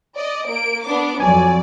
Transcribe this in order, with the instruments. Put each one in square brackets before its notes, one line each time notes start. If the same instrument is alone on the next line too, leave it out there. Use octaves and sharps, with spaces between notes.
[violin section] D5 D#5
A#3 D7
B3 D4 D6
[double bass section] F2 F#3 [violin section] D5 [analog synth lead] G#5